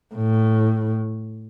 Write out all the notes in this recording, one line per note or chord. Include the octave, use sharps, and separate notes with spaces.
A2